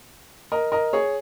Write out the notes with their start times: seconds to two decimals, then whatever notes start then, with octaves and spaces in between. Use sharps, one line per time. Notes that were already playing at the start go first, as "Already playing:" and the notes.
0.52 A#4 D#5
0.72 A#4 D#5
0.93 G#4 C#5